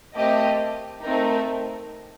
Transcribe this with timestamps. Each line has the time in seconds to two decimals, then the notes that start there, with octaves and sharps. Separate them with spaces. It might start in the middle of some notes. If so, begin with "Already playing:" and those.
0.15 A3 C4 G4 A#4 D#5
1.03 A3 C4 D#4 A#4